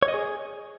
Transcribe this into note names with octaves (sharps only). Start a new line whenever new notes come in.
C#5
D#5
G#4